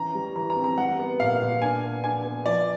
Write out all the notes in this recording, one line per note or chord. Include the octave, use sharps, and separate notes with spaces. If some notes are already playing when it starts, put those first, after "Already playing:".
Already playing: E3 C#4 A#5
G3
E3 A#5
A#5
C4
A#5
G3 F#5
B3
A#2 F5
A#2
D4 G#5
B3
D4 G#5
B3
F3 D5